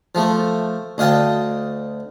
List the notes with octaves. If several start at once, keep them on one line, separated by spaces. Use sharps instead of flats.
F3 A3
D2 D#5 F5 G5 A5